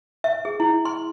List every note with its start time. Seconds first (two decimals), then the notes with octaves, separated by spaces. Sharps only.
0.24 E5
0.45 G#4
0.60 E4
0.85 C6